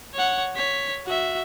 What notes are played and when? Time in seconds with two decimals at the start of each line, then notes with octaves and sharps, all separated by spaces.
0.14 C#5 F#5
0.55 C#5 B6
1.06 F#4 E5